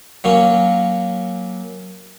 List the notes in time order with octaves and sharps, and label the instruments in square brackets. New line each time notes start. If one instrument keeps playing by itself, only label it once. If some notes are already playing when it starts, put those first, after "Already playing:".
[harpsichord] F#3 A#3 C#4